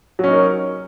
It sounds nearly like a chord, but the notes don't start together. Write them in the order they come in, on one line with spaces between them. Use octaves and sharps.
F#3 C#4 D#4 A#4